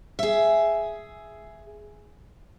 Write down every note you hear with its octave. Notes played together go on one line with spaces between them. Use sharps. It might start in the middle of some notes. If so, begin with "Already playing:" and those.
G#4 E5